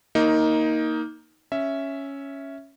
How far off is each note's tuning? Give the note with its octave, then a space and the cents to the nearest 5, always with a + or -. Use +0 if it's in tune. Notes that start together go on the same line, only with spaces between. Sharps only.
A#3 +0 D#4 +15
C#4 +0 E5 +0